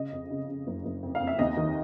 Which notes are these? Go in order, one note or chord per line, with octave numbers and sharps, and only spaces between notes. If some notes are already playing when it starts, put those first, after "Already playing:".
Already playing: C#3 D#5
F2
C#3
C#3
F#1
F#1
F2
F5
F2
E5
D#2 D#5
D#3